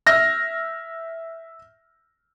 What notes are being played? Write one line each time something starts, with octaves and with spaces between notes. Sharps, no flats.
E5 F6 A#6